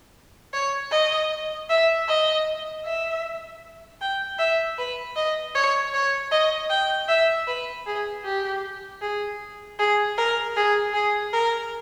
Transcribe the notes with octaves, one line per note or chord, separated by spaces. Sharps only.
C#5
D#5
E5
D#5
E5
G5
E5
B4
D#5
C#5
C#5
D#5
G5
E5
B4
G#4
G4
G#4
G#4
A#4
G#4
G#4
A#4